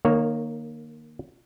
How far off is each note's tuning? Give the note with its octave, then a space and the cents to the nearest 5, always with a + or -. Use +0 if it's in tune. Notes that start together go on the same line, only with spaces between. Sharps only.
D#3 -35 A#3 +0 C#5 +0